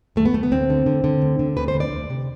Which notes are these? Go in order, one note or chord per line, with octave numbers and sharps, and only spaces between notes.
D2 A3
B3
D2 A3
B3
D2 C4
D3
D3
D3
D2
D3
D2 B4
C5
D2
D5
D2
C3